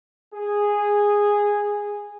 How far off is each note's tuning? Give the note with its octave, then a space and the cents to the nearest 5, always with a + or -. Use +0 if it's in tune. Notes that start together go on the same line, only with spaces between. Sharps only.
G#4 -10